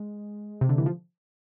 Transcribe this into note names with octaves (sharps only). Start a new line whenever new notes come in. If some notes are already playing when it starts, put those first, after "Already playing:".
Already playing: G#3
C3
D3
E3
F3